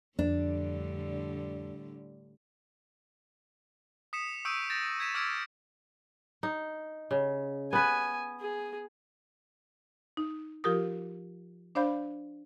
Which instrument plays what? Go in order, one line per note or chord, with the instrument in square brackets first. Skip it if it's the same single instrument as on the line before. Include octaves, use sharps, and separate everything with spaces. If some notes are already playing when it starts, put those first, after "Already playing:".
[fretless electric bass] F2 [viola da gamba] A2 D3 G3 [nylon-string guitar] D4
[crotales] D#6 B6 C#7 E7
C#6 D#6 E6 G6 D7 D#7
G6 A6 A#6 E7
G#6 B6 E7
D6 E6 F6 G#6 B6 D7
[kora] D#4
C#3
[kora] B3 B4 [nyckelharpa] G#5
[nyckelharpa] G#4
[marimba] D#4
F3 F4 G4 A#4 D#6
D4 C5 D5 F5 B5 G6